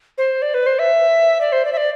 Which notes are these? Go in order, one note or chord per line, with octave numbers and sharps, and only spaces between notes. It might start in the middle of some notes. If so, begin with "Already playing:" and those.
C5
D5
B4
C5
E5
D5
C5
D5
E5
D5